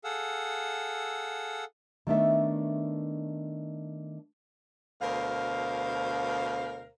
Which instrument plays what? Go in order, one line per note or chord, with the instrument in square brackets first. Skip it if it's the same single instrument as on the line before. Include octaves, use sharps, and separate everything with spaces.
[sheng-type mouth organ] G#4 A4 F5 F#5 E6
[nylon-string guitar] D#3 A3 B3 D4 D#4 E5
[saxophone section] D2 B2 A#4 C5 F5